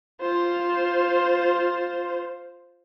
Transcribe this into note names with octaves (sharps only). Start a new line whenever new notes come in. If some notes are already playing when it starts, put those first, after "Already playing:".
F4 C5